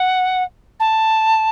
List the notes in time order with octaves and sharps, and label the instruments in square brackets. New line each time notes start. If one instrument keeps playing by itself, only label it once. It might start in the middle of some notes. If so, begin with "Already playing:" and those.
Already playing: [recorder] F#5
A5